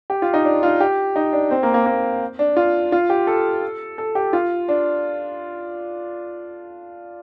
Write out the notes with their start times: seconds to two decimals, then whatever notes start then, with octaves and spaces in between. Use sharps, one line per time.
0.10 G4
0.22 F4
0.34 D#4
0.45 D4
0.63 F4
0.80 G4
1.16 D#4
1.33 D4
1.51 C4
1.63 A#3
1.74 A#3
1.86 A#3
2.39 D4
2.57 F4
2.92 F4
3.10 G4
3.27 A4
3.98 A4
4.15 G4
4.33 F4
4.68 D4